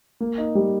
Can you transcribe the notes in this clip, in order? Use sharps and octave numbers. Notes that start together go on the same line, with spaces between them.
A#3
D#4
G3